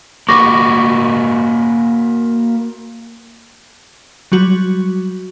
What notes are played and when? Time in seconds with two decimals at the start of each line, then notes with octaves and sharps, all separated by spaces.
0.29 A#3 F#4 B4 C#6 D6 A#6
4.32 F#3 G3 F#4